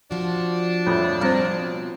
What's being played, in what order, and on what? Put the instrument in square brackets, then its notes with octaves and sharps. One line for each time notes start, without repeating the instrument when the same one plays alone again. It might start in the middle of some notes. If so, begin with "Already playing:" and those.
[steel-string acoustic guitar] F3 F#4 [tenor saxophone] D4
[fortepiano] F2 A2
[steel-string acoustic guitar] B2 F3 F4 [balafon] G3 C4 C5